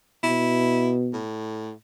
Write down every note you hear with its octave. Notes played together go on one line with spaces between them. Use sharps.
B2 E4
A2